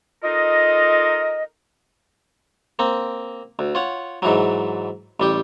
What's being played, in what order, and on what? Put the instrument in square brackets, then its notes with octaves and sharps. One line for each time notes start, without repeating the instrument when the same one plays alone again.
[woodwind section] D#4 F4 A4 A#4 D#5
[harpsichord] A#3 C4
D2
F4 C#5 F#5
G#2 E3 F#3
A1 G3 G4